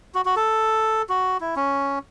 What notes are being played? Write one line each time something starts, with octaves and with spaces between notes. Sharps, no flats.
F#4
F#4
A4
F#4
E4
C#4